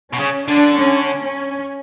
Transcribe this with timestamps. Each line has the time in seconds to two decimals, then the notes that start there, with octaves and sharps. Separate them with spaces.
0.13 B2
0.19 C#3 C#4
0.48 D3 D4
0.79 C#4
1.22 C#4